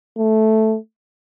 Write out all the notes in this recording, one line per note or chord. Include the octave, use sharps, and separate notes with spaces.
A3